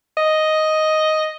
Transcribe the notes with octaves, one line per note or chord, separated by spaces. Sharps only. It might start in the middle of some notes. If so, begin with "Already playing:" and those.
D#5